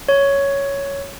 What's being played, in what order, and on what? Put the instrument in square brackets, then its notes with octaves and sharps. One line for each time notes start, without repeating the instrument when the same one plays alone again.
[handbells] C#5